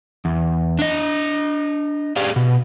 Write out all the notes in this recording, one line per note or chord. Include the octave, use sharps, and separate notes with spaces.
E2
D4 D#5
G4 G#4 D5 F5
B2